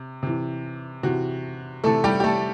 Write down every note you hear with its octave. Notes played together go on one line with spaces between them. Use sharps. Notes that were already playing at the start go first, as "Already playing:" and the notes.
Already playing: C3
C3 E3
C3 E3 F#4
C3 E3 A3 A4
G3 G4
G4
A3 A4